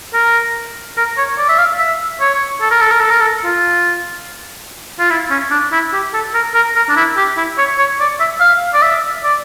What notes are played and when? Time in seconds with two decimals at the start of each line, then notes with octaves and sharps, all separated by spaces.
0.14 A#4
0.97 A#4
1.17 C#5
1.38 D5
1.49 E5
1.58 F5
1.79 E5
2.21 C#5
2.62 A4
2.71 A#4
2.81 A4
2.91 A#4
3.00 A4
3.10 A#4
3.20 A4
3.44 F4
4.99 F4
5.10 E4
5.30 C#4
5.51 D4
5.72 E4
5.93 G4
6.14 A4
6.34 A#4
6.55 A#4
6.76 A#4
6.89 D4
6.97 E4
7.17 G4
7.37 E4
7.58 C#5
7.78 C#5
8.00 D5
8.20 E5
8.41 F5
8.74 D5
8.82 E5
9.24 D5